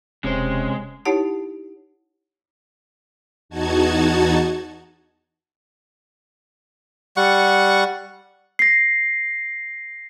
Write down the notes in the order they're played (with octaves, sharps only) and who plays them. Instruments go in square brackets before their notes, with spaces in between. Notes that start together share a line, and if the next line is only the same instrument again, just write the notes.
[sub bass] E1 [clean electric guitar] C3 G4 C5 [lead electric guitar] G#3 [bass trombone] C#4
[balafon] D#4 E4 G4 C#5 F#5 A5
[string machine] E2 D#4 F#4 A5 G#6
[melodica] G3 F#5 C#6
[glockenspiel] A#6 C7